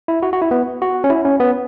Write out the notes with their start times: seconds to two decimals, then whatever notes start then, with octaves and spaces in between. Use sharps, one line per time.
0.08 E4
0.23 F#4
0.33 F#4
0.42 E4
0.51 B3
0.82 F#4
1.04 C#4
1.10 E4
1.25 C#4
1.40 B3